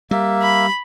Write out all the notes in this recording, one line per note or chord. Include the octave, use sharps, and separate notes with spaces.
G3 A#3 E5
B5